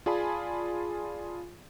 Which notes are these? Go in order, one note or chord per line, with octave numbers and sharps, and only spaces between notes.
F4 G#4 D5 G#5 A5 B5